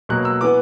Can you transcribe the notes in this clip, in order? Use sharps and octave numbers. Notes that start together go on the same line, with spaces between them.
B2 F#3 A#3 F#6
E6
E3 B3 D6